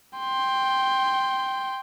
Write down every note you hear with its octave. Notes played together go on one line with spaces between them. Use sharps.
G5 C6